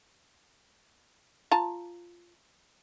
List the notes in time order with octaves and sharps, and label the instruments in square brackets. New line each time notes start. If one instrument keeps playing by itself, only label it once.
[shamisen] F4 A5 A#5